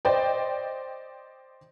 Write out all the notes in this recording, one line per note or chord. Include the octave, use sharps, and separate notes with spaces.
C5 D5 D#5 G5